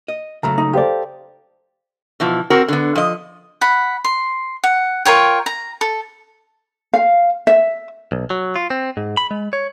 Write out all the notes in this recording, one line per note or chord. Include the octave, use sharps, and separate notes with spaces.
D#5
C#3 F#3 A3 A#5
D#4
G4 A4 C5 D5 F5
B2 E3 F3
C4 F#4 A#4
D3 B3
F3 D#5
F#5 B5
C6
F#5
F4 A#4 C#5 G5
A#5
A4
F5
E5
B1
F#3
F4
C4
G#2
B5
G#3
C#5